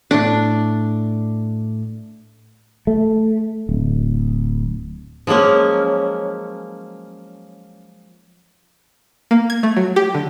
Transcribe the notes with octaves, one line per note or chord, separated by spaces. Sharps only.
A2 A3 D4
A3
D1
F3 F#3 G#3 A#3 C#4
A#3
G#6
A3
F#3
G4
D3